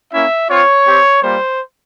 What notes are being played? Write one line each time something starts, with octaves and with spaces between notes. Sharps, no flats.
A#3 C#4 E4 E5
C4 F4 C#5
C4 G4
G3 A#3 F4 C5